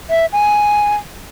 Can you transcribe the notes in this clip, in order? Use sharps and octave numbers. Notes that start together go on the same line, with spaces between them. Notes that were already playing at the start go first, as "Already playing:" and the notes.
E5
G#5